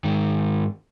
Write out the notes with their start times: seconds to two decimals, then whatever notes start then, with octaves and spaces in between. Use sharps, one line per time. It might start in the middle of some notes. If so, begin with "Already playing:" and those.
0.04 G#2 D#3